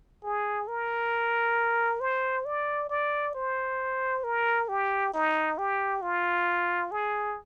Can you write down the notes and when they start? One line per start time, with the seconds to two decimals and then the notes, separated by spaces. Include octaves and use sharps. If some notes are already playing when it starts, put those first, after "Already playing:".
0.23 G#4
0.68 A#4
2.01 C5
2.45 D5
2.90 D5
3.35 C5
4.24 A#4
4.69 G4
5.14 D#4
5.58 G4
6.02 F4
6.91 G#4